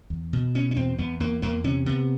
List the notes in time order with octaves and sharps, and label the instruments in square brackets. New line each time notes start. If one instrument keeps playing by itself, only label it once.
[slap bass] E2
B2
B2 C#4
C#4
E2 C4
E2 B3
E2 A#3
E2 A#3
C3 C#4
C3 B3